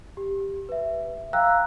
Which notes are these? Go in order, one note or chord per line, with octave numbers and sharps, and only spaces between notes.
G4
B4 E5
F5 G5 A#5 E6 F#6